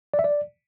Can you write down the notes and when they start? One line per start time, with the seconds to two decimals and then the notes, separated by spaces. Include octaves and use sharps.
0.14 D5
0.19 E5
0.24 D5